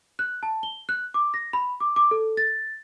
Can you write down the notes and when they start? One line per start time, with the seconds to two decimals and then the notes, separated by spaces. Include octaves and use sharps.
0.19 F#6
0.43 A5
0.63 G7
0.89 F#6
1.14 D6
1.34 A#6
1.53 B5
1.80 D6
1.96 D6
2.11 A4
2.37 A6